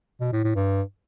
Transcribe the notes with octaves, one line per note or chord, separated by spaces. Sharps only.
B2
A2
A2
G2